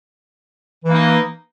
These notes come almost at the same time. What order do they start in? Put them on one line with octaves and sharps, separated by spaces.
E3 A#3 D#4